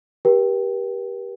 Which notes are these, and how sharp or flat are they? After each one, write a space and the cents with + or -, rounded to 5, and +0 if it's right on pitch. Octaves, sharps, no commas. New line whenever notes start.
G4 +0 A#4 +45 G5 +5